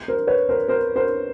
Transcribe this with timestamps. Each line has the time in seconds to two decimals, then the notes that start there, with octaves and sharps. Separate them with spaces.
0.08 A#4 C5
0.27 B4 C#5
0.49 A#4 C5
0.68 A#4 C5
0.96 A#4 C5